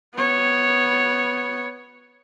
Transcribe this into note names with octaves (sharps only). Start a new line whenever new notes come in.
B3 C#5